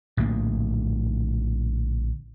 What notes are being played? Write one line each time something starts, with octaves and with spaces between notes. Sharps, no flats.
A#1 A2 D3 A#3